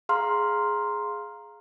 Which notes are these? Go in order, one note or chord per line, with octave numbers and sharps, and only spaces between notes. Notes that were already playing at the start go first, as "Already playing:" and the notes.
G#4 F5 A#5 C6 F6